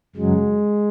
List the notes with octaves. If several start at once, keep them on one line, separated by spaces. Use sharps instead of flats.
F#2 C#3 F#3 G#3